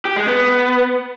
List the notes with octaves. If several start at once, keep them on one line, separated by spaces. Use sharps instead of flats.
G4
G#3
B3